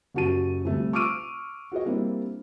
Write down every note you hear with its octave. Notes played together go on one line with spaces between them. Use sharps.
F#1 F#2 F#4 G4 A5 D#7
D2 C3 G3 A3
C#6 D6 E6 F6 D7 D#7
F#4 G#4 D#5
G3 A#3 C4 D4 E4